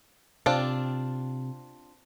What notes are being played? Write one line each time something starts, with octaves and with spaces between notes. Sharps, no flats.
C3 C4 D4 F4